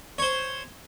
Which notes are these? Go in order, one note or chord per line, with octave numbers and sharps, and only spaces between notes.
C5 C#5